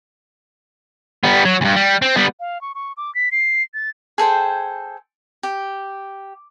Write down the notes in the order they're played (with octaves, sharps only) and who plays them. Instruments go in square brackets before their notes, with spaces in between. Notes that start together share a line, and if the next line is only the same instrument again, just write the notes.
[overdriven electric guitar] G3 B3
F#3
D2 G2
G3
C4
G3 B3
[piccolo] F5
C#6
C#6
D6
B6
C7
A6
[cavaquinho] G#4 A4 C5 G5
G4